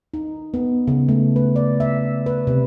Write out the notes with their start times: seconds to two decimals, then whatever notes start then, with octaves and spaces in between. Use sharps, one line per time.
0.14 D#4
0.54 B3
0.87 C#3
1.09 A3
1.36 B4
1.56 D5
1.80 E5
2.26 B4
2.47 C3